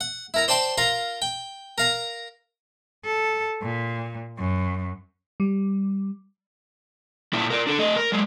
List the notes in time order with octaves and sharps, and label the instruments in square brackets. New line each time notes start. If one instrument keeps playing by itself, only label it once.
[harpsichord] F#5
E4 A#4 A#5
C5 D5 G5 A5 C6 D6
F4 A#4 F5 A#5
G5
A#4 F5 A#5
[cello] A4
A#2
F#2
[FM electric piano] G3
[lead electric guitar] A#2 E4
A#4 D5
D4 A4
A3 D#5
A#4
F#3 G#3